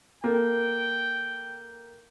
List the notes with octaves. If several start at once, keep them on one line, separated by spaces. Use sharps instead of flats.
A#3 A4 G5